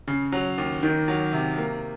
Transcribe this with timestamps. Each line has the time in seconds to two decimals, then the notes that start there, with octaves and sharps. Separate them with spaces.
0.08 C#3
0.32 F#3
0.58 D#2
0.83 D#3
1.08 F#3
1.33 C3
1.58 A#3